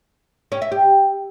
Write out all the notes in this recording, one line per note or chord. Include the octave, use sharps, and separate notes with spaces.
C#4
E5
G4